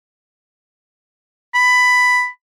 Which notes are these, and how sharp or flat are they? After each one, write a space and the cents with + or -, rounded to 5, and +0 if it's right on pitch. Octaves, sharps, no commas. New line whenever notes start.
B5 +10